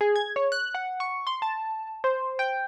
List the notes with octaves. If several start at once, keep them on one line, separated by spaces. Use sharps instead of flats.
G#4
G#6
C#5
F#6
F#5
C#6
C6
A5
C5
G5